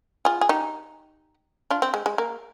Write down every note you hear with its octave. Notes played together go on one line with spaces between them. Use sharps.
F4 G#4
G#4
D#4 G4
D4 F4
C4
G#3
G#3
A#3